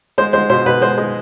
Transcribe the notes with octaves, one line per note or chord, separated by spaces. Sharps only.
G#3 C5
G#3 C5
B2 C5
B2 B4
G#3 C5
G#3